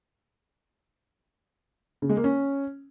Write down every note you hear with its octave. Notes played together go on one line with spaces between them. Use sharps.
C#3
G#3
A#3
C#4